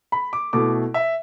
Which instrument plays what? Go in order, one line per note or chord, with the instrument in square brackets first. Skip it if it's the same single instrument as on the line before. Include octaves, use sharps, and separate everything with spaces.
[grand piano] B5
D6
B2 A3 E4 D6
E5